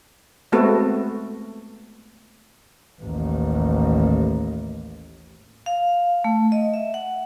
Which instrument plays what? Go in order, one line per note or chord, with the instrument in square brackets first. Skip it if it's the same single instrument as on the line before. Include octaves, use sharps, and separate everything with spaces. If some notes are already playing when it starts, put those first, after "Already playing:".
[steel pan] G#3 A3 B3 C4 F#4 A4
[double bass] A1 D#2
[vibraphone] F5
A3
D#5
E5
F#5